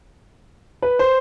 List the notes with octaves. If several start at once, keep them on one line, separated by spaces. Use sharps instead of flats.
B4
C5